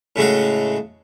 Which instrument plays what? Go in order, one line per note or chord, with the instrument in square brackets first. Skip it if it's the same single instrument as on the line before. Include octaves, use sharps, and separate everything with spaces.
[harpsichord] A2 C#3 G#3 F#4